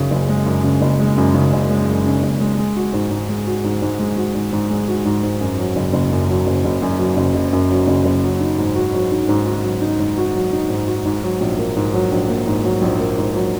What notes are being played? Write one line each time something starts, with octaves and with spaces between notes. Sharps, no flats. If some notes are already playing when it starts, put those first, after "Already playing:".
Already playing: F#2 C#3
F#1
G#3
F#2
C#3
F#1
G#3
F#2
C#3
F#1
G#3
F#2
C#3
F#1
G#3
G#3
F#4
G#2
G#2
G#3
F#4
G#2
G#2
G#3
F#4
G#2
G#2
G#3
F#4
G#2
G#2
F#2
F#3
F#1
F#1
F#2
F#3
F#1
F#1
F#2
F#3
F#1
F#1
F#2
F#3
F#1
F#1
F#3
D#4
G#2
F#4
F#3
D#4
G#2
F#4
F#3
D#4
G#2
F#4
F#3
D#4
G#2
F#4
G#2
F#3
A#1
A#3
G#2
F#3
A#1
A#3
G#2
F#3
A#1
A#3
G#2
F#3